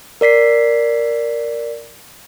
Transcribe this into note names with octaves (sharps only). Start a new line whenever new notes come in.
A#4 D5 B6 C7